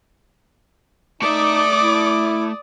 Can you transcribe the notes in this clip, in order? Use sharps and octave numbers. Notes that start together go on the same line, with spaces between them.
A3 D#4 D5 E5 D6 D#6
E4